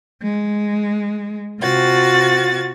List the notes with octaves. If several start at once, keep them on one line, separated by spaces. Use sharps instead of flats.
G#3
C3 F4 F#4 A6